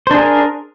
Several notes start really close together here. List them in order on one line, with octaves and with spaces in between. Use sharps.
C5 D4 G#4 A#4